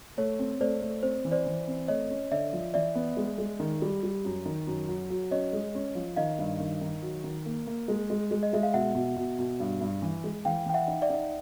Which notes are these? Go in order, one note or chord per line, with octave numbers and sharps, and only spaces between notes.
A3 C#5
C4
A3 C5 D5
A3
C4 C5
E3
C5 D5
E3
C4
A3 C#5 D#5
C#4
D3 D5 E5
F3
E3 D5 E5
B3
G#3
G#3
D#3
G3
G3
F#2
D#3
F#2
F#3
F#3
C#4 C#5 D#5
G#3
C#4
F3
D#3 D#5 F5
G2
D#3
D#3
F#3
D#3
A#3
A#3
G#3
G#3
G#3
D#5
G#3 E5
F5
B2 E5 F#5
B2
B2
B2
G2
G2
E3
G#3
E3 F5 G5
E3 G5
E5 F#5
D#4
D5 E5
D#4